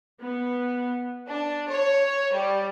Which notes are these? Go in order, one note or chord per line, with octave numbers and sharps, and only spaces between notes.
B3
D4
C#5
G3